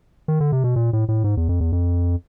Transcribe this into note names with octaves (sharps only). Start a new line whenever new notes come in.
D#3
D3
C3
B2
A#2
A2
A2
G#2
E2
F2
E2
F2